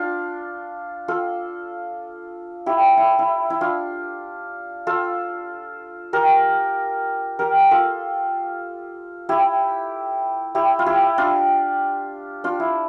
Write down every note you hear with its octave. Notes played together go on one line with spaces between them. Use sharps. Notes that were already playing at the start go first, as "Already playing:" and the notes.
Already playing: D4 F4
F4 A4
E4 G4
E4
E4
E4
D4 F4
F4 A4
G4 A#4
G4 A#4
F4 A4
E4 G4
E4 G4
F4
E4 G4
D4 F4
D4 F4
E4